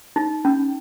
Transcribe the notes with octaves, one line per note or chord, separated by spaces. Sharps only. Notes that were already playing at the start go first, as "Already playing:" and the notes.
D#4
C#4